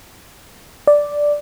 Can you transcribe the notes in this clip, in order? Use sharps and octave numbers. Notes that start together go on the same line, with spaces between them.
D5